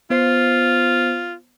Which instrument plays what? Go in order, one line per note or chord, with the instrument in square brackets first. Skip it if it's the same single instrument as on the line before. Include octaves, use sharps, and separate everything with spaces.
[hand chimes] B3 C5 C7 [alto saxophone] F4